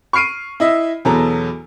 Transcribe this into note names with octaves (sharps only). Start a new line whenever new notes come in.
C#6 F6 C7 D7 D#7
E4 D#5 E5
E2 B2 F#3 A4 A#5